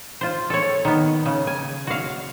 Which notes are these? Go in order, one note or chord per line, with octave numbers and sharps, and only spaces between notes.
F4 C5
A4 C#5
D#3 B3
C#3
G#5
F#4 F5